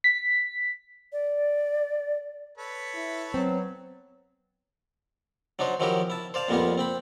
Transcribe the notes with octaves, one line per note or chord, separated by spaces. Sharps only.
B6
D5
A4 B4 C#5
E4
F#3 B3 C4
F#3 D4 D#4 C5
D#3 F3 F#3 E4 G4 A#4
E4 A5
C5 D5 F5 A5
F2 A#2 G3 A#3 B3 F4
C4 G5 B5